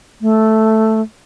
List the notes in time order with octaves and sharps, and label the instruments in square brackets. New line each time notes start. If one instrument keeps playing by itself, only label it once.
[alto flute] A3